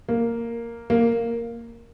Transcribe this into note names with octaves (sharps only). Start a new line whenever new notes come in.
A#3
A#3